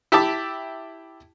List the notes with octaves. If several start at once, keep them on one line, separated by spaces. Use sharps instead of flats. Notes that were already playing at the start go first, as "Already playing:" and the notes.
E4 G4 E5 A5 D6